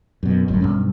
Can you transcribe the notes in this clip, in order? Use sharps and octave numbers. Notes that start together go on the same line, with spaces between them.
F#2 B2
G1 F#2 A2
B1 G2 C#4